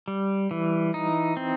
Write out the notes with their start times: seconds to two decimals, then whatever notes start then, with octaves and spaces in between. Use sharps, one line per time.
0.08 G3
0.51 E3
0.94 D#4
1.37 C4